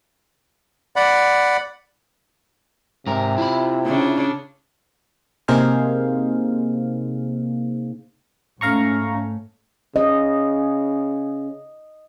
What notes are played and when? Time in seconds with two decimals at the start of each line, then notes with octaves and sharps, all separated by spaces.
0.96 D5 F#5 B5
3.07 G#2 C3 A#4
3.38 E4 F4 B5
3.86 C#3 D4
5.48 C3 A#3 D#4 G#4 C5 F5
8.61 G#2 A3 C#4 F5 A#5 C#6
9.96 C#3 D#5